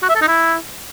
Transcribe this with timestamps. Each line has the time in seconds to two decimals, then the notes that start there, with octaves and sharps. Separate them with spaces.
0.03 F#4
0.09 E5
0.15 A4
0.22 D#4
0.28 E4